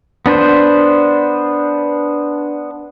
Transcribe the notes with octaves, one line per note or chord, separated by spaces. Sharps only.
B3 D4 B4 C5